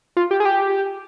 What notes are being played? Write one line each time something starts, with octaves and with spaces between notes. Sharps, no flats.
F4
G4
G#4
G4